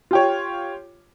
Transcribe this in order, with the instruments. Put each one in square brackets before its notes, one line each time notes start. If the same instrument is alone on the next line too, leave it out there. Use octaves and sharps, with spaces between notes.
[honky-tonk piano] F4 G4 C#5